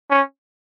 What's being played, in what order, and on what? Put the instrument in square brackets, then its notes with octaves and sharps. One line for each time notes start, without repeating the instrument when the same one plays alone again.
[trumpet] C#4